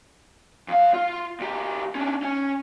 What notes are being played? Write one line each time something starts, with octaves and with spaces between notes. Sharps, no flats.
F2 F5
F4
D2 G4
C#4 D4
C#4